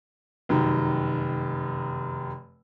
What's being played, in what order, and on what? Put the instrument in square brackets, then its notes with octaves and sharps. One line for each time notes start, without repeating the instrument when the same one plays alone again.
[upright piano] F1 F#2 D#3